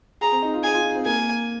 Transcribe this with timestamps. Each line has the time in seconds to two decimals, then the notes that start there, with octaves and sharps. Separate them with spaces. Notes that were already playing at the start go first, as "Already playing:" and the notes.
0.21 G#4 A#5
0.32 C4
0.42 D#4
0.53 F4
0.63 G#4 G#5
0.74 F4
0.85 D#4
0.95 C4
1.06 A#3 G#5